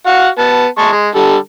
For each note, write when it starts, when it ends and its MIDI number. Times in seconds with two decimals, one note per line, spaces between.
0.07 0.28 66
0.07 0.28 77
0.07 0.28 78
0.38 0.66 59
0.38 0.66 81
0.78 0.89 56
0.78 0.89 81
0.78 0.89 85
0.92 1.08 56
1.15 1.36 50
1.15 1.36 55
1.15 1.36 69